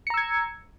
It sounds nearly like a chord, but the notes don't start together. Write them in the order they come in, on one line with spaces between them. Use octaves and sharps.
C#7 A#5 E6 G#6